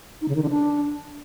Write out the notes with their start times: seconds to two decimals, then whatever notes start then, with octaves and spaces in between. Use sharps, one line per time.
0.21 D#4
0.28 C#3
0.36 D#3
0.43 D3
0.50 D4